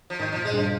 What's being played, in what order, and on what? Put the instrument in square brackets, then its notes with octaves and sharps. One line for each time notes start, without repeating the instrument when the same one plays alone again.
[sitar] F3
[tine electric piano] G#2 [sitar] D#3
[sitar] F3
[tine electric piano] A#2
[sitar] G#3
[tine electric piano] G2
[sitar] F3